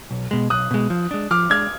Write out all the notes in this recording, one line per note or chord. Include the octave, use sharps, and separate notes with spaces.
B1
B2 G#3
B1 D#6 F#6
B2 G#3
F3
G#3 D4
F3 D6 F6
G#3 D4 F6 G#6